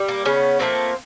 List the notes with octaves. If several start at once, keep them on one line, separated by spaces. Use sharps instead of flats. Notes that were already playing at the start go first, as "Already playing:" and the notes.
Already playing: G3
A#3
C#3 B3 C#4
F3 A3 A#3 C4